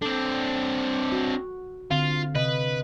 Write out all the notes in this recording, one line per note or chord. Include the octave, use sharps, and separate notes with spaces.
C4 D4 A4
F#4
D3 C4 F4 F5
C3 B4 D#5